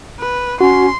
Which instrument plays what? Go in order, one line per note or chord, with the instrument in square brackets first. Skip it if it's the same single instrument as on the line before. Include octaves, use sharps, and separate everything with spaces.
[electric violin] B4
[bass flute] C#4 [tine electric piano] F#4 [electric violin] C6